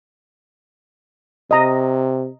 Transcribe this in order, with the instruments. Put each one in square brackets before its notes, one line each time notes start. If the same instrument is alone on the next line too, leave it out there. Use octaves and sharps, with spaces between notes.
[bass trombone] C3 [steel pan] D#5 A#5